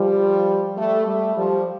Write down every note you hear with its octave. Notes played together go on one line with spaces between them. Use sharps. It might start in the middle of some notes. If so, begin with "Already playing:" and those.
Already playing: F3 G3
G3 A3
G3 A3
F3 G3